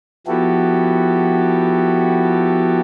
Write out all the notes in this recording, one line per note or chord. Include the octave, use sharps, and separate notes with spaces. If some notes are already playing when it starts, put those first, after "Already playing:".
F3 B3 E4 F#4 G4 A4